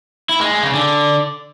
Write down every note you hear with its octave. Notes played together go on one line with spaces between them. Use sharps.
E4
G#3
G#3
C#3
D3